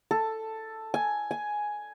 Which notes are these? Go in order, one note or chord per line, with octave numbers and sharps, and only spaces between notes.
A4
G#5
G#5